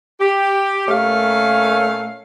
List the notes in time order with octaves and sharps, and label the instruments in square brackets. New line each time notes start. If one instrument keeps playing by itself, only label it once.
[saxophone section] G4
A#2 A3 C#4 A#4 F5